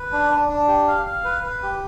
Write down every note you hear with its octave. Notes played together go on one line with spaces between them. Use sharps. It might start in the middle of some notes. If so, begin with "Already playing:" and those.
Already playing: B4
D4
D4
D4
G4
F5
F5
B4
B4
G4